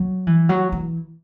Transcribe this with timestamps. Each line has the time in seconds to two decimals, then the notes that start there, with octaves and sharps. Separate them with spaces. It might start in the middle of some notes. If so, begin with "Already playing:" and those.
Already playing: F#3
0.27 E3
0.49 F#3
0.72 E3